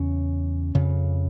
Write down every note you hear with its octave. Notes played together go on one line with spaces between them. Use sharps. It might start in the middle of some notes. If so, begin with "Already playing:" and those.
Already playing: E2 C#3 C#4
F2 C#3